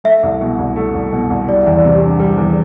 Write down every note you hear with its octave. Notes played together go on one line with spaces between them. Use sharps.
A3 E5
C2
B2
C2
A3
C2
B2
C2
G3 D5
E2
D5
C3
G4
D4
G3
E2